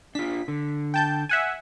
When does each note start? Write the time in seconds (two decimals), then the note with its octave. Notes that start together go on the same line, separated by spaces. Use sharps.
0.15 D4 F4 B6
0.48 D3
0.94 G5 A5 G6
1.29 E5 F#5 G#5